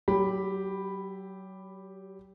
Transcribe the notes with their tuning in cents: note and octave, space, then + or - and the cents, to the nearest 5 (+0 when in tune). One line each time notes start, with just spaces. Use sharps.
F#3 +30 G4 +0 B5 +0